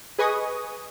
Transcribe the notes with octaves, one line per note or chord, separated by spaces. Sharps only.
G#4 B4 D#5 G#5 C#6 D#6